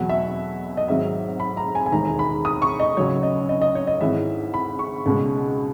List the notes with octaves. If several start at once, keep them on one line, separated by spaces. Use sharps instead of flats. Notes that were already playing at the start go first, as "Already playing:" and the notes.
Already playing: E2 B2 F#3 F#5
E5
D#5
G#1 G#2 F#3 E5
B5
A#5
G#5
G#5
E1 D#2 D#3 G#3 A#5
B5
D#6
C#6
D#5
C#2 C#3 F#3 C#5
D#5
D#5
D#5
C#5
D#5
G#1 G#2 E3 E5
B5
C#6
C#2 B2 G#3